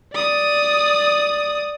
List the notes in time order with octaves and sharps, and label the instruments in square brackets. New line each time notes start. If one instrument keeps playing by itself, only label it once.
[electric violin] D5 D#6